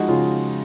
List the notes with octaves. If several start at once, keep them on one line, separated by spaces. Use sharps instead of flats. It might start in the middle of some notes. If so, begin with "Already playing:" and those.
Already playing: F3 G#3 D#4 F#4
C#3 F4 G#4